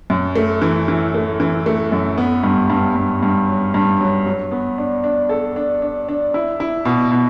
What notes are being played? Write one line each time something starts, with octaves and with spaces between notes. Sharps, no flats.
F#2
A3
E3
E3
A3
E3
A3
F#2
B3
G2
G2
G2
G2
F#3
G2
F#3
F#3
B3
D4
D4
A4
D4
D4
D4
E4
E4
B2
B2